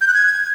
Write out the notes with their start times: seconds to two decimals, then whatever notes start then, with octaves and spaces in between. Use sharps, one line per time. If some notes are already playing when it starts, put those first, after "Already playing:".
0.01 G6
0.08 F#6
0.14 G#6